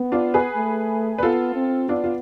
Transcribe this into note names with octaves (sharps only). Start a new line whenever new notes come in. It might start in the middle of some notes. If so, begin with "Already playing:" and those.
Already playing: B3
D4 F4
G#4 B4
A3
B4
B3 F4 A4
C4
B3 D4 F4
F4